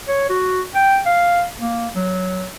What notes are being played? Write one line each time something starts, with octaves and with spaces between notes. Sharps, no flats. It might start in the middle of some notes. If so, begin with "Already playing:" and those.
C#5
F#4
G5
F5
A#3
F#3